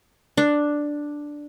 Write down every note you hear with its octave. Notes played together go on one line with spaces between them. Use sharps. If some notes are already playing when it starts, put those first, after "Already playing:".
D4